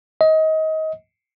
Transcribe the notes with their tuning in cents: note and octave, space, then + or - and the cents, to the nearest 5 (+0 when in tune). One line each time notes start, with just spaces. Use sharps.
D#5 +25